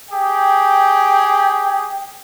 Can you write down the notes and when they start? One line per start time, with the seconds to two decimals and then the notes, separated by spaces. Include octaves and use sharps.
0.11 G4 G#4 G5